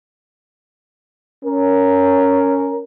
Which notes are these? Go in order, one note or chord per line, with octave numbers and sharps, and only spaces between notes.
C#4 A#4